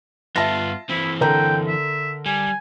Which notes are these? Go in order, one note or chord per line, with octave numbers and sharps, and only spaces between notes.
G2 B3 F4 E5 A5 A#6
E3 C4 E4
D3 A#4 G5 A#5
E5
G3 G#5